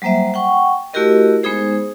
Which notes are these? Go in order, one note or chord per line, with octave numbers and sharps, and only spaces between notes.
F#3 G3 A#3 C5 E5
F#5 G5 C#6
A3 E4 F#4 G4 A#4 D#5
G#3 B3 D#4 G#4 C5